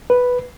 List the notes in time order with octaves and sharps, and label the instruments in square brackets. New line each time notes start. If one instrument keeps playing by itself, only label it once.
[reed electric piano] B4